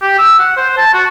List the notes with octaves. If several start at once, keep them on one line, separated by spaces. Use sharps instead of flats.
G4
E6
F#5
C5
A5
F#4